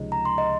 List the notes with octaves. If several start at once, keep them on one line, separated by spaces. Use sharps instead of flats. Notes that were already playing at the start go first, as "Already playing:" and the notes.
Already playing: C#2 C3 F3 G#3 D#4
A#5
C6
D#5